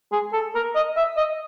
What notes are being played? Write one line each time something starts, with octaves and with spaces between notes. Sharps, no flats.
G#4
A4
A#4
D#5
E5
D#5